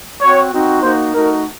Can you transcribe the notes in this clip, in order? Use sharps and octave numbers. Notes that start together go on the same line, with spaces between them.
C4 F#4 C#5
C4 D#4 F#4
A#3 D#4 F#4 C5
A3 D#4 F#4 A#4